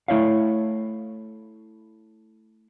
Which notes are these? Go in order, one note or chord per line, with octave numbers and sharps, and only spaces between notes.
A3 E4 C#5 F5